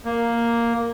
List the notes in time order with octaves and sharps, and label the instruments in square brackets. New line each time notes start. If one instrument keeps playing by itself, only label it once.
[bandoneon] A#3